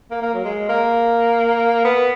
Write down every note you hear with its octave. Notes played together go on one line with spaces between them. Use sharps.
A#3
A#3
F#3
G#3
A#3
B3